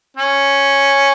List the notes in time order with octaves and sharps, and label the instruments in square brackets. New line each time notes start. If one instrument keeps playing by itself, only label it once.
[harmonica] C#4